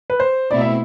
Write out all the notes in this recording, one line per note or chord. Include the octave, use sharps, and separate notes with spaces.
B4
C5
B2 A3 C4 E4 D5
E5